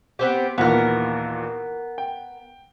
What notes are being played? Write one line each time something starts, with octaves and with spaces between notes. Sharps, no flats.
B3 C4 G4
D#2 A#2 E3 B3 A#4
G5